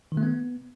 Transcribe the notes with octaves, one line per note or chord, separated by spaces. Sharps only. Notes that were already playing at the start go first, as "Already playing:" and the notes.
D#3
A3
B3